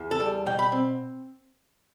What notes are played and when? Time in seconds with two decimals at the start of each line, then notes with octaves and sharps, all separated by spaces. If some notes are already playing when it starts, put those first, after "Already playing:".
Already playing: E2
0.11 A4
0.20 G3
0.46 B2 G5
0.59 B5
0.72 C4